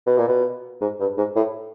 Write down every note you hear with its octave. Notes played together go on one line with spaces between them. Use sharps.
B2
A#2
B2
G#2
G2
G#2
A2